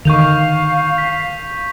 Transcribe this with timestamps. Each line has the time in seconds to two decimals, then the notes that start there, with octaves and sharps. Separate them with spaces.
0.05 D3 D#3 F5 C#6 G6 F7
0.98 B6